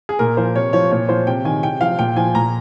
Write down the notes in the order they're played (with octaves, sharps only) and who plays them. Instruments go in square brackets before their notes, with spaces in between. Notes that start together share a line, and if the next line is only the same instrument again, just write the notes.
[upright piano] G#4
A#2 A#4
F3 C5
C3 C#5
F3 C#5
A#2 C#5
F3 C5
C3 G5
D#3 G#5
C3 G5
F3 F5
A#2 G5
F3 G#5
A#2 A#5